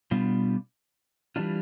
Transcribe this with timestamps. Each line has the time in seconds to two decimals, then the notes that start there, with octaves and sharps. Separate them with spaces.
0.11 B2 G3 B3 D4 F4
1.36 E3 G3 D4 F4